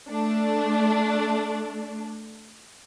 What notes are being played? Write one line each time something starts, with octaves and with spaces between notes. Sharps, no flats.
A3 D4